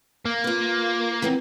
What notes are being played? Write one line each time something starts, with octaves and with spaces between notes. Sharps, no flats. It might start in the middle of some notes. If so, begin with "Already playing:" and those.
A#3
F4 B4
E3 B3 C4